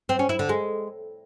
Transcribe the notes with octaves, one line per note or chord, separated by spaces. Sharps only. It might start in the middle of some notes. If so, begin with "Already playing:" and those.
C4
C#4
E4
D3
G#3